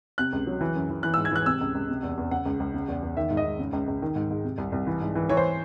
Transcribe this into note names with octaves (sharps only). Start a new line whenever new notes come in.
C3 F#6
C#2
F#3
E3
F#2
E3
E3 F#6
G#2 E6
G#6
E3 F#6
C3 E6
C#2
C#2
C3
E2
E2
C#3 F#5
C#2
C#2
C#3
E2
E2
D#3 E5
G#2
D#5
G#2
C#3
C#2
C#2
D#3
G#2
G#2
C3
C2
C2
E3
G#2
E3
E3 C#5
C5